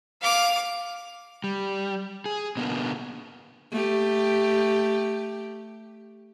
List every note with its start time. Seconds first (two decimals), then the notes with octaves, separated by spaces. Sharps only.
0.22 F5 D6
1.44 G3
2.26 G#4
2.57 B2 D3 A#3 B3
3.71 A3 G4